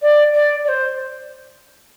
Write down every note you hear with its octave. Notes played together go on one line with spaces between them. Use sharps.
D5
D5
D5
C5